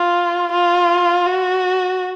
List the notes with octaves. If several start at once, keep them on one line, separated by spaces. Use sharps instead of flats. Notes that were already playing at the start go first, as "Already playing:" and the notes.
Already playing: F4
F4
F#4